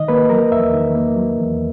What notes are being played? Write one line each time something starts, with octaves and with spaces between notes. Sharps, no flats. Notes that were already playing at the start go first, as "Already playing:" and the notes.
Already playing: D#3 D#5
A#3 B4
F#3 A#4
E2 E5
D#3
A#3
F#3
E2